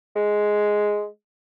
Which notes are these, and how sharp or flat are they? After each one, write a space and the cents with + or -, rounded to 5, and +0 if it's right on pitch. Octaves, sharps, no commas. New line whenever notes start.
G#3 +5